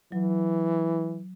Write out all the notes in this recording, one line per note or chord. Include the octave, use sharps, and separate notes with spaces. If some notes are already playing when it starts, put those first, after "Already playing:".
E3 F#3